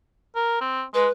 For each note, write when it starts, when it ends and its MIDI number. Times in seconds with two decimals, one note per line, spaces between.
0.35 0.57 70
0.61 0.83 60
0.94 1.07 56
0.94 1.11 71